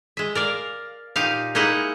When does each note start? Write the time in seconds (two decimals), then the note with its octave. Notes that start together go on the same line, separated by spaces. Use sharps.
0.17 G#3 E5
0.35 A#4 D5 F5
1.16 A#2 D#4 G4 F5
1.55 G#3 A#3 D#4 E4 F#5